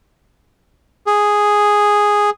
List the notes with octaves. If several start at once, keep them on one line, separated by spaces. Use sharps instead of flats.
G#4